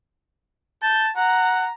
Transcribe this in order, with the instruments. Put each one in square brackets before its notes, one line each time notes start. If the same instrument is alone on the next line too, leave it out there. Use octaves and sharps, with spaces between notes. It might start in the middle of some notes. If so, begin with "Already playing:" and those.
[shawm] A5 [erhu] G6
[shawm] F#5 [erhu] A#5